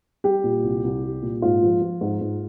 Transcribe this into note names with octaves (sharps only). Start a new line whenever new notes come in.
G3 G4
A#2
C2
C2
G3
A#2
G#2 F4
F3
F3
G#2
G#2